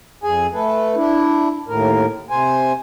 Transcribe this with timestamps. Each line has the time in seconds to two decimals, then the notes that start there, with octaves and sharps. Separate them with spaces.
0.23 F2 G#4 G#5
0.54 A3 A4 B4
0.96 D4 E4
1.68 D#2 A2 A#4
2.30 C3 C5 G#5